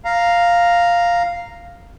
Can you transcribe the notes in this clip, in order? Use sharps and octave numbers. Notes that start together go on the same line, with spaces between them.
F5 A#5